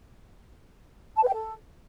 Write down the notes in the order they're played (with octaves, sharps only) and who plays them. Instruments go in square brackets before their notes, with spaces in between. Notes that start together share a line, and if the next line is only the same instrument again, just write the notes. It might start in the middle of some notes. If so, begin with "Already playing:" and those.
[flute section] A5
B4
G5
A4